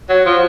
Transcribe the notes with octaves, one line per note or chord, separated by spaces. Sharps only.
F#3
F3